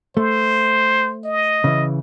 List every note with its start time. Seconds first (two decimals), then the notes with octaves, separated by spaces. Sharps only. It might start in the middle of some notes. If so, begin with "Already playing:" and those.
0.17 A3 C5
1.25 D#5
1.64 C#3 E3